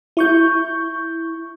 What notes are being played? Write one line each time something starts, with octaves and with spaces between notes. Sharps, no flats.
E4 C#6 G6